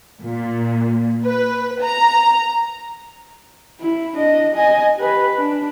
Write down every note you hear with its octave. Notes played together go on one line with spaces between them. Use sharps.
A#2
B4
A#5
E4
D4 D#5
D#5 G#5
G4 B4
D4